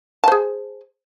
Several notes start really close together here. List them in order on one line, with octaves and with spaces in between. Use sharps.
A5 C5 G#4